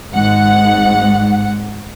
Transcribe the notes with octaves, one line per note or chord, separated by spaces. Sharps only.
G#1 G#2 F#5